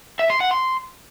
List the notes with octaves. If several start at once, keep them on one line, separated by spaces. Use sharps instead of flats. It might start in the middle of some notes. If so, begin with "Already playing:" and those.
E5
C6
F#5
C6